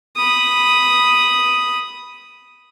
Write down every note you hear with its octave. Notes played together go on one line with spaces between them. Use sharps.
B5 D#6